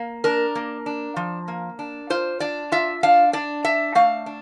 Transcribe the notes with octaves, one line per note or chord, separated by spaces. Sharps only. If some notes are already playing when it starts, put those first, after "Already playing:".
Already playing: A#3
D4 A#4
A#3
D4
F3
A#3
D4
F4 C5
D4 D5
F4 E5
D4 F5
D4 D5
D4 E5
A3 F5
D4